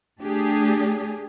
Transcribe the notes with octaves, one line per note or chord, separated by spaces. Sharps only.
A3 D4 G4 G#4